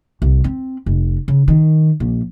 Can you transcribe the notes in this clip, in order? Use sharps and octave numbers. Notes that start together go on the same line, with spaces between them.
C2
C4
F1
C#3
D#3
A#1